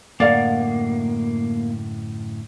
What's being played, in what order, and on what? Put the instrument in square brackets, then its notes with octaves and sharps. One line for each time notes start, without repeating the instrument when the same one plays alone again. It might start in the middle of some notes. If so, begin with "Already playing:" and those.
[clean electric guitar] F#2 A2 D3 [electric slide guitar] A#3 [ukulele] D5 F5 F#5